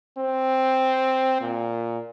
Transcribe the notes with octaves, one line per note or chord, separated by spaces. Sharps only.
C4
A#2